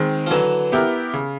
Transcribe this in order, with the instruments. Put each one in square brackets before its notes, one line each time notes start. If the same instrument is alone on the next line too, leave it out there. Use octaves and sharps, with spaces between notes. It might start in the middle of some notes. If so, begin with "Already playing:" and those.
Already playing: [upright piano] D#3 G#3 C4
[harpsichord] F3
[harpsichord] D3 E3 [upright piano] F#3
[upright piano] B3 E4 G4 A#4
C#3